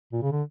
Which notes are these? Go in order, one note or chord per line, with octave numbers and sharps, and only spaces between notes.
A#2
C#3
D3